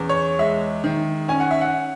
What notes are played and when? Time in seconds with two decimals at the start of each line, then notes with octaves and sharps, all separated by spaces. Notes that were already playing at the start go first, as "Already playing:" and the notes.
Already playing: E2 C#4
0.09 C#5
0.39 G#3 E5
0.84 D#3
1.28 C#4 G#5
1.40 F#5
1.51 E5
1.61 F#5